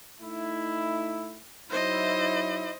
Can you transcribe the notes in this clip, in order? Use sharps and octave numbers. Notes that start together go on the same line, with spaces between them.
A3 D#4 E4
F#3 D#4 E4 C5 D#5